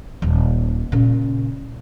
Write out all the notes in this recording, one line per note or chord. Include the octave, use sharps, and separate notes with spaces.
D#1 D#2
A#2 C#3